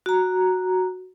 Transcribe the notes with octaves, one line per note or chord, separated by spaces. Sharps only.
F#4 A#5